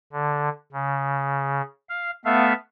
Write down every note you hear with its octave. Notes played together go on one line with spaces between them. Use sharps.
D3
C#3
F5
A3 B3 E5 F5